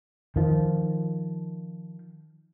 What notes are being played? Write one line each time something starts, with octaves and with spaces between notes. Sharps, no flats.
D#3 F3